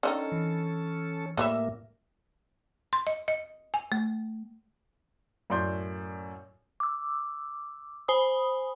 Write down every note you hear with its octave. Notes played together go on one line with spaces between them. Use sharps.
D3 D#3 C#4 D#4 A4
E3
A2 E3 G3 A#3 E5
C6
D#5
D#5
G#5
A3
F#2 A2 D5 C6 G6
D6 E6
C5 G#5 B5 D#6